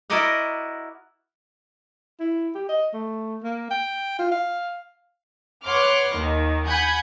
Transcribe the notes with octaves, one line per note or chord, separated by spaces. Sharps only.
E4 F#4 A#4 D5 D#5 F#5
E4
G4
D#5
A3
A#3
G5
F4
F5
B4 C#5 F#5 C6 D6 F6
D#2 D#3
F#5 G#5 B5 G6 G#6